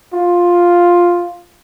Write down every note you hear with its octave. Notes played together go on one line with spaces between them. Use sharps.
F4